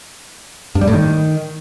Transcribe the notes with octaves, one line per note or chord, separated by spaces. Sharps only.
G2
G3
A2
D#3